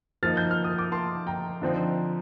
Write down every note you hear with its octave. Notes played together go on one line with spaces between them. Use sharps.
F3 A#3 D#4 F6 A6
G6
F6
D#6
D6
A5 C6
G5 A#5
D3 F3 C4 D#4